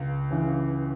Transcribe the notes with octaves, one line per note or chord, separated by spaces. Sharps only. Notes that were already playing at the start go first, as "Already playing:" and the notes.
Already playing: C#2
C#3 E3